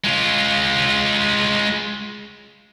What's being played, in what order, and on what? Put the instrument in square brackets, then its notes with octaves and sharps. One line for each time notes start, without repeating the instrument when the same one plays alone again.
[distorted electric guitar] G#3 F4